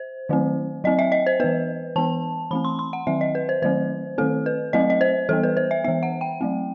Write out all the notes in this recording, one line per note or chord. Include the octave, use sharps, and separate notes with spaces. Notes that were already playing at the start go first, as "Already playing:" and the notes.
Already playing: C5
D#3 F#3 A3 C4
F#3 C4 D#5
E5
D#5
C5
E3 B3 B4
E3 B3 A5
E3 A3 C4 B5
C6
C6
F#5
D#3 F#3 C4 E5
D#5
B4
C5
D#3 F#3 A3 C4 C5
D#3 A3 C4 A4
B4
F#3 A3 C4 D#5
D#5
C5
E3 G3 B3 A4
B4
C5
E5
E3 B3 E5
F#5
G5
F#3 A3 C4